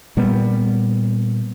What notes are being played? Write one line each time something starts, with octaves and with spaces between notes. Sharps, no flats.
A#2 G3 B3